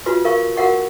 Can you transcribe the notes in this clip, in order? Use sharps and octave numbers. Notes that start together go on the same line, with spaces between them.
F4 F#4 B4 C6
A#4 F5 C#6
F#4 A#4 F5 F#5 C#6